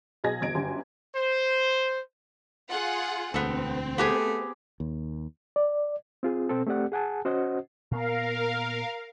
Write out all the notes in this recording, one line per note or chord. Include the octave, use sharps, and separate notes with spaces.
B1 G#4 D#5 G#6 A#6
G1 E2 D#5 G#6 A#6 D7
G1 F#2 G4 G#5 C6
C5
F4 G#4 F#5
E1 D2 B3 C4 A4
A3 B3 G4 G#4
D#2
D5
C4 F4 G#4
B2 C4 A4
A3 C4 G4 A4 D5 F#5
G#4 F#5 G#5 A5
C#4 F#4 C5 D#5 F#5
A#2 B3 A#4 F5